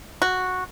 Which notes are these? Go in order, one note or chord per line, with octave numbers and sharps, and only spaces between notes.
F#4